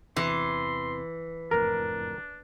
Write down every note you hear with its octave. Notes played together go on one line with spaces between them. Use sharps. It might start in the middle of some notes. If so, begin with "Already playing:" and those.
E2 C3 E3 C6
F#1 F2 A2 D4 A#4